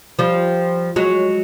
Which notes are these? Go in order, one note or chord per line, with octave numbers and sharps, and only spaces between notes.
F3 G3
F#3 G#3